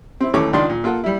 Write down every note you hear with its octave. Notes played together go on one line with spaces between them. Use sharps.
C4 E4
D#2 E3 A3 C#4 C#5 D6
C#2 D#3 D4 F4 D5 C6
A#2
A#3 F4 A4 F#5
G3 E4